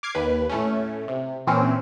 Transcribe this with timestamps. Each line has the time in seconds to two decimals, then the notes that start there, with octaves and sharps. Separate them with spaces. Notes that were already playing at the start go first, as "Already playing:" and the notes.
0.03 D6 F6 G#6 C7
0.15 D#2 B4
0.49 A2 A3 C#4
1.08 C3
1.47 A#2 E3 C4 C#4